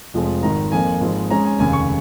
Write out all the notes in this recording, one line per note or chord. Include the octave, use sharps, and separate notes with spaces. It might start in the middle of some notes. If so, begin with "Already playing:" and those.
F1 F2 F3 G#3
G#1 G#2 D#3 A#5
F2 F3 A#3 G#5
G#1 G#2 F3 G#3 D#4
G#2 G#3 C#4 A#5
G#5
F1 D#2 C#3 G#5
C#6